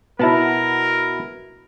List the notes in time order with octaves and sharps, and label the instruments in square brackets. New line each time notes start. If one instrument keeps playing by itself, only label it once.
[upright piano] B2 E4 [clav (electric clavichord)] B3 F#5 A5 [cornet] A#4